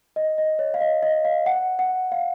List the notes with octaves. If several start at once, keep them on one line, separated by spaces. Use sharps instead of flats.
D#5
D#5
C#5
F5
D#5
D#5
F5
F#5
F#5
F5